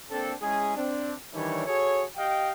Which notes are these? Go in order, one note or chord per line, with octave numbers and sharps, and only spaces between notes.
A#3 C4 D4 A4
G#3 C#4 E4 G#4
C4 D4
D#3 E3 G3 D4 E4 C#5
F#4 G#4 A4 C#5
G4 D#5 F5 G5